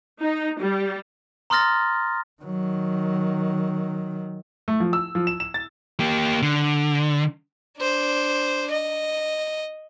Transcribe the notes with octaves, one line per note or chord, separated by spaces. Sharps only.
D#4
G3
A#5 C6 D#6 F6 A6 A#6
D#3 F#3
A3
F3
E6
F3
E7
E7
A6
A#3 G4
D3
D4 C5
D#5